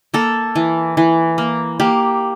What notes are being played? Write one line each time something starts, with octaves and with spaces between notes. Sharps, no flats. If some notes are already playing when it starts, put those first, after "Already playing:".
A#3 A4
E3
E3
A#3
A#3 G4